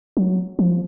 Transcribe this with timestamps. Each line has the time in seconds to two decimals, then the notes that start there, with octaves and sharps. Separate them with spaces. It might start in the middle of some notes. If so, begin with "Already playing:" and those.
0.17 F#3
0.59 F3